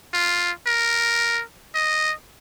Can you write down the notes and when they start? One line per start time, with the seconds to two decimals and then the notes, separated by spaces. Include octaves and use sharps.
0.14 F4
0.67 A#4
1.75 D#5